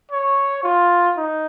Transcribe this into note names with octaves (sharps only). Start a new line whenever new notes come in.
C#5
F4
D#4